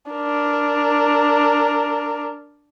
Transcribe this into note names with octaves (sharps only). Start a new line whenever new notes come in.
D4 A#4